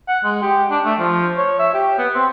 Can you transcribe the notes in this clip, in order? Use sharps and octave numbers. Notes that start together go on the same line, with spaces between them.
F#5
G#3
G4
D4
A3
F3
C#5
E5
G4
B3
C4